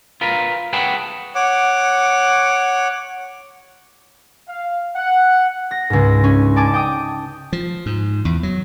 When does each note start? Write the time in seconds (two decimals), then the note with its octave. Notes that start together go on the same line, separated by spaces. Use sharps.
0.21 F4 A#4 B4
0.73 G#4 B4 C#5 F#5 G5 A5
1.35 C#5 F#5 D6
4.48 F5
4.96 F#5
5.71 A#6
5.90 C#2 G#2
6.24 C#4
6.56 D5 G#5 A5 D6
6.73 G5 D6 D#6
7.53 F3
7.86 G#2
8.25 E2
8.43 F#3